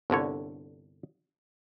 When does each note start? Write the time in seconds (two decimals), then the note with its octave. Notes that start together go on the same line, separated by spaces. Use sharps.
0.10 G1 C2 D3 C#5